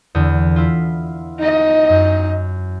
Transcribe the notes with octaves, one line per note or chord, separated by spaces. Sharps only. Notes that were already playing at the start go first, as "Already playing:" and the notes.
E2 D3
E4 F4
D#4 D#5
F#2